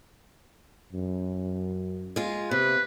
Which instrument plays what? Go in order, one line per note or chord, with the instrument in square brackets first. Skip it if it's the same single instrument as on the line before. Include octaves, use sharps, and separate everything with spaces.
[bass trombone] F#2
[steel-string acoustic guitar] G#3 F4
[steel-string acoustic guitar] C3 [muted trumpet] B4